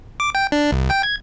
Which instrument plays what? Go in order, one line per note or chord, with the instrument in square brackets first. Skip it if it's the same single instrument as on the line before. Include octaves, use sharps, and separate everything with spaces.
[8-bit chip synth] D6
G5
D4
C2
G5
G#6